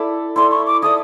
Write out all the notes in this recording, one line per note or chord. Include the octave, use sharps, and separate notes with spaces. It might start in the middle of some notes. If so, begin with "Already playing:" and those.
Already playing: E4 A4 D5
E4 A4 D5 C6
C#6
D6
E4 A4 D5 D#6